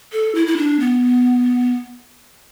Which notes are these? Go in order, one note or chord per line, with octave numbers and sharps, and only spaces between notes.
A4
E4
E4
D4
B3